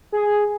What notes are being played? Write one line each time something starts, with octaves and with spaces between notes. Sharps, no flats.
G#4